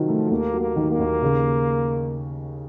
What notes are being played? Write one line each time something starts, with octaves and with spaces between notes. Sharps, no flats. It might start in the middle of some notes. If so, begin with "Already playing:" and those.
Already playing: C3 D#3 F3 F#3
A3
D#2 A#3
F#3
A#3
D#3
A#3
D#2
C#3